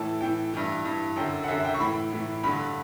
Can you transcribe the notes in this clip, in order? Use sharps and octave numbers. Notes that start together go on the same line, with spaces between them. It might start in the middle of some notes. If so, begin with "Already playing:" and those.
Already playing: A2 E3 A5
A2 E3 G5
G2 E3
G2 E3
F#2 D3 G5
F#5
F#2 D3 E5
G5
C#6
A2 E3 B5
A2 E3
G2 D3 B5